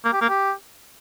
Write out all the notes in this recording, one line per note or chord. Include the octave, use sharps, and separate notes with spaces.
A#3
G4
A#3
G4